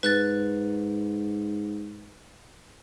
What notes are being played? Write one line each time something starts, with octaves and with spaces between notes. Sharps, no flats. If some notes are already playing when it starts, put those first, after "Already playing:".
G#2 B4 F#6 A6